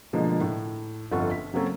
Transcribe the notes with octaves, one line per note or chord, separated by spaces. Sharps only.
B2 D3 F3 G#3 A#3
A2
G1 F2 F4 A4 F#5 C#6
B6
C#3 F#3 A#3 C4 C#4 A4